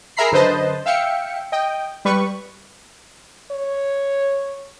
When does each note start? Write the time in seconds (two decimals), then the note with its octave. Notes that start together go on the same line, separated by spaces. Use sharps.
0.17 G#4 A#4 E5 A#5 B5 C7
0.32 F#2 D3 B4 C5 D#5 A5
0.86 E5 F5 G5 C#7
1.52 D#5 G5
2.05 G3 B4 C#6
3.51 C#5